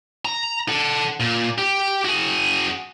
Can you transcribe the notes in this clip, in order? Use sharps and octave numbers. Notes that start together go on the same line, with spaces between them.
A#5
A4 F#5
A#2
G4
F#4 G#4